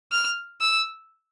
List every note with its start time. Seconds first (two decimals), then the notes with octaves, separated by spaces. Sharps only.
0.12 F6
0.60 E6